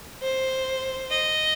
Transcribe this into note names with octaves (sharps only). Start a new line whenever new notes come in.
C5
D#5